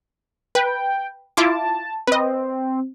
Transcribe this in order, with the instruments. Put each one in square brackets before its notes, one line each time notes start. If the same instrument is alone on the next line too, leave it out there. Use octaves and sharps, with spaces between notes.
[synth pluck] B4 [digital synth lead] G5
[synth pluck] E4 F4 D6 [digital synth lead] A5
[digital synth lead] C4 [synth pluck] B4 D#5